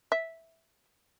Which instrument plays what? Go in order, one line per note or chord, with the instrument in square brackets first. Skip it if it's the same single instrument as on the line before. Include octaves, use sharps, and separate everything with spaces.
[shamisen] E5